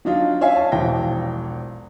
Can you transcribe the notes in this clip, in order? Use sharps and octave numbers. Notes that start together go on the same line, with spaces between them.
F#3 D4 D#4 F4
C#4 F4 C#5 E5 F5 G#5
A5
E1 A#1 E3 G5 A#6